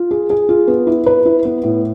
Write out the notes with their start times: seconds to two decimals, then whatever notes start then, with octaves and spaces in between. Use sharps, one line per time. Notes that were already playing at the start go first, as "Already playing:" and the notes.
Already playing: F4
0.11 G#4
0.30 G#4
0.49 F4
0.67 B3
0.87 E4
1.06 B4
1.25 E4
1.45 B3
1.64 A2